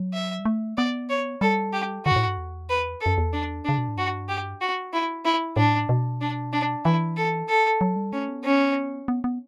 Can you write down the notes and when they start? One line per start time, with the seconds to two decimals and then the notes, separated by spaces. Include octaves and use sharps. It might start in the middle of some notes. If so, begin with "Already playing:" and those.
Already playing: F#3
0.14 E5
0.40 G3
0.45 A3
0.77 B3 D5
1.10 C#5
1.41 G3 A4
1.73 G4
2.06 D3 F#4
2.11 G2
2.16 A2
2.27 G2
2.38 E2
2.69 B4
3.01 A4
3.06 F#2
3.18 E2
3.33 D4
3.65 C#3 D4
3.78 B2
3.88 A2
3.97 G2 F#4
4.29 G4
4.61 F#4
4.93 E4
5.25 E4
5.56 A2 D4
5.89 B2
6.21 D4
6.53 D4
6.85 E3 E4
7.17 A4
7.49 A4
7.81 F#3
7.96 G3
8.13 A3 C#4
8.29 B3
8.44 C#4
9.08 B3
9.24 B3